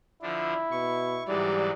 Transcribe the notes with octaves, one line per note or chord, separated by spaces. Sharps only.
D3 F3 D4 E4
B2 C#6
G#2 E3 F#3 G3 D5